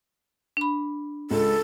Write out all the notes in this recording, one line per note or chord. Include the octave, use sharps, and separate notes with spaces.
D4 B5
C#2 A4